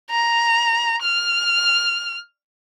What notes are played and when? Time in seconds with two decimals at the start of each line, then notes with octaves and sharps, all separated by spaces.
0.10 A#5
1.03 F6